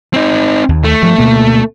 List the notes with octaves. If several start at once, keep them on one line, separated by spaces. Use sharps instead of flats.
C4 D#4
D#2
A3
G2 F3
D2 B2 A#3